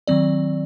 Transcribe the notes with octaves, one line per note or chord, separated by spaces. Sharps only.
D#3 F#3 C4 D5